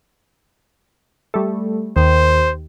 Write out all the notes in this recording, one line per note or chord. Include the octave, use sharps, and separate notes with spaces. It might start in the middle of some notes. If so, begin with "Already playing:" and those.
G3 A3
D#2 C5